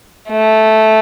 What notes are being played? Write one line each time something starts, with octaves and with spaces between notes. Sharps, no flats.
A3